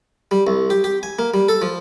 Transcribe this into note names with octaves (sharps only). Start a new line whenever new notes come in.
G3
C2
G4
G4
G#5
A#3
G3
A4
F3